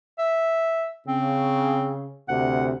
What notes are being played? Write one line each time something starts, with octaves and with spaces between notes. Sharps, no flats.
E5
C#3 C4
D2 C3 F#5